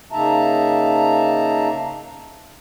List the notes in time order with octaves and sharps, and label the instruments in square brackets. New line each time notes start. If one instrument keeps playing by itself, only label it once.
[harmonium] C#3 A#3 D#4 E5 A5 A#5